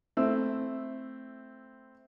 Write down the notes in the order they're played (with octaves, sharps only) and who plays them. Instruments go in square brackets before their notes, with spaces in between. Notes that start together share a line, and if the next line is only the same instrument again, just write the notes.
[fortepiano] A3 C4 E4 E6